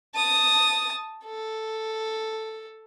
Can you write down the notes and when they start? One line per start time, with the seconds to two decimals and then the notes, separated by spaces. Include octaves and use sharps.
0.15 A5 D#6
1.25 A4